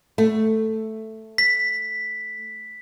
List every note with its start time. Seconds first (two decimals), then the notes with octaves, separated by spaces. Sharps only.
0.18 A3
1.38 B6